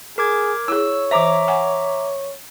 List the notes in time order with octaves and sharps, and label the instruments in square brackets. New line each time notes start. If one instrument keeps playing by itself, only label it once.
[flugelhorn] G#4 [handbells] A#4 D6 G#6
[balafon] E4 G#4 [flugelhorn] C#5 [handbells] E6
[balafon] E3 C5 [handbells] E5 A#5 D6
[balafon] F#5 G#5